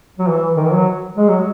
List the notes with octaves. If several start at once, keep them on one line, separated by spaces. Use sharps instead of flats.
F#3
E3
D#3
E3
F#3
G#3
F#3